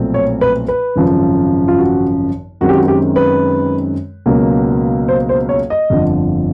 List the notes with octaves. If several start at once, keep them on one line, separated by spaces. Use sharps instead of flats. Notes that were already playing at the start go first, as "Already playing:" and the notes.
Already playing: B1 A#2 F3 A3 C4
C#5
B4
B4
G#1 F#2 C#3 F3
F4
F#4
F#2 D#3 G#3 C4 F#4
G4
F#4
G4
B4
C#2 B2 F#3 A#3
C5
C5
C#5
D#5
G1 F2 D3 F3